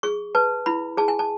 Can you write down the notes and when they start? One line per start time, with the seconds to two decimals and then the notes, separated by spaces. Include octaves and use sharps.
0.03 G#4 C#6
0.35 B4 A5
0.66 E4 B5
0.97 G#4 A5
1.08 G#5
1.19 A5